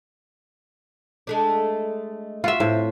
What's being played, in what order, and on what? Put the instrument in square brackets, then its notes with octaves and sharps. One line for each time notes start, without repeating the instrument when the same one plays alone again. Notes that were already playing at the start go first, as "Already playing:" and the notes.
[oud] G#3 A3 D4
[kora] F4 E5 [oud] F#4
[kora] A2 [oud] C4